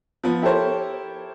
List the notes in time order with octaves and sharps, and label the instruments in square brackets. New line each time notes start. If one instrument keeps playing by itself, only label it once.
[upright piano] F3 B3
E4 G4 A4 A#4 C5 C#5